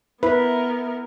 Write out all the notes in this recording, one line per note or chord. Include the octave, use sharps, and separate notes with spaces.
B3 E4 A#4 B4